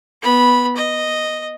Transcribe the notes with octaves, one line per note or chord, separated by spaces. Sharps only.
B3 B5
D#5